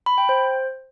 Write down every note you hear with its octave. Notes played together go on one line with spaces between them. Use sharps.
B5
G5
C5